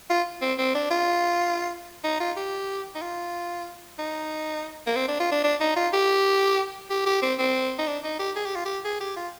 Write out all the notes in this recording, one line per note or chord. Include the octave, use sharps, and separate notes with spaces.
F4
C4
C4
D4
F4
D#4
F4
G4
D#4
F4
D#4
A#3
C4
D4
F4
D4
D4
D#4
F4
G4
G4
G4
C4
C4
D#4
D4
D#4
G4
G#4
G4
F4
G4
G#4
G4
F4